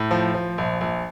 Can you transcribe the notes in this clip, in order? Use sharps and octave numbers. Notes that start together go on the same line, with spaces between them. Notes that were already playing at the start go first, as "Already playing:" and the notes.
Already playing: A2
F3
F3
A#1
A#1